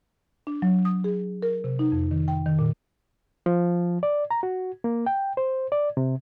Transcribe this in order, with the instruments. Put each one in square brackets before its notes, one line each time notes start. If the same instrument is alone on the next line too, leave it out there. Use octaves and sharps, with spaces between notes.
[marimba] D4
F#3
D#6
G#4
A#4
C3
D#4
F2
D#3
G5
D#3
A#2
[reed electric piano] F3
D5
A#5
F#4
A#3
G5
C5
D5
C3